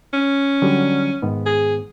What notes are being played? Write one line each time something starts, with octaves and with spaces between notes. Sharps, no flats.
C#4
D3 F#3 G3
G#2 D#3 B3
G#4